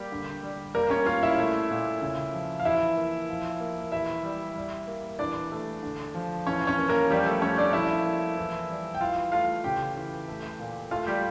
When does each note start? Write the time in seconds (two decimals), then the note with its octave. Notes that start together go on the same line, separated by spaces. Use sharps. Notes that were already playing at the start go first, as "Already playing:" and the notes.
Already playing: G3 A#3 G4
0.12 D3
0.43 G3
0.74 G3 A#3 A#4
0.90 C#4 C#5
1.06 A#3 F4 F5
1.23 E4 E5
1.38 A3
1.71 A#2
2.01 C#3
2.33 F3
2.60 F5
2.65 E3 E4 E5
2.97 A#3
3.29 F3
3.60 A#3
3.92 E3 E4 E5
4.24 G3
4.56 G3
4.87 A#3
5.19 E3 D4 D5
5.52 A3
5.83 D3
6.15 F3
6.47 E3 C#4 C#5
6.67 C#4 C#5
6.78 A#3
6.88 A#3 A#4
7.11 F3 G3 G4
7.26 A3 A4
7.42 A3 C#4 C#5
7.57 D4 D5
7.73 F3 E4 E5
8.05 A#3
8.37 E3
8.70 G3
8.95 G5
9.01 E3 F4 F5
9.32 A3 F4 F5
9.64 C#3 G4 G5
9.96 E3
10.28 A3
10.59 A#2
10.91 A3 F4 F5
11.07 G3 G4